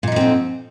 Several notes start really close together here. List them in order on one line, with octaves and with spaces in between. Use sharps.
A#2 D#4 F3 C4 D3